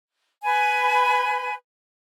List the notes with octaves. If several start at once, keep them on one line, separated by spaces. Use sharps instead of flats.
B4 G#5